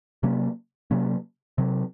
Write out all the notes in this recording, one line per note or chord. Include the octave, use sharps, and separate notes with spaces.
C3 F#3 A#3 C#4
C3 F#3 A#3 C#4
C3 F#3 C4